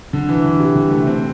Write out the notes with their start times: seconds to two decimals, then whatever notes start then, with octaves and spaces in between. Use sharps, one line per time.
0.13 D3
0.29 E3
0.44 D3
0.59 C3
0.76 D3
0.91 A3
1.07 C4